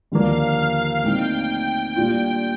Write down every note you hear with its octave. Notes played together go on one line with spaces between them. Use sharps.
D#2 D3 F3 A#3 F5
A#2 A3 C4 D#4 G5
A#2 G3 D4 F4